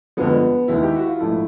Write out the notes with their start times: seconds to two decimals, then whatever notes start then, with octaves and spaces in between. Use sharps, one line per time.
0.17 G1 F2 D3 F3 G#3 B3
0.68 D#2 D#3 G#3 E4
0.83 G4
0.96 F#4
1.07 F4
1.20 A#1 G#2 F3 A3 E4